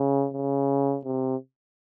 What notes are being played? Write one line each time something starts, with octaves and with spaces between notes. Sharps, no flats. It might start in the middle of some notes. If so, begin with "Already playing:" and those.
Already playing: C#3
C#3
C3